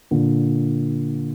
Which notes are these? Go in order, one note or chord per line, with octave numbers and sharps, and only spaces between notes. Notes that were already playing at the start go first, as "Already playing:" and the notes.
A#2 D3